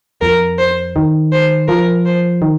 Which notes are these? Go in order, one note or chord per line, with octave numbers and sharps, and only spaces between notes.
F2 A#4
C5
D#3
C5
F3 A#4
C5
D#3